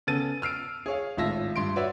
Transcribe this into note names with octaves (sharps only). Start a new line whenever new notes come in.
C#3 B3 A4 A6 D#7
E6 F6 C7 D7
G#4 C#5 F5
G#1 A2 F4 E5 A5 A#6
G2 C6 D7
F#4 B4 C#5 D5 E5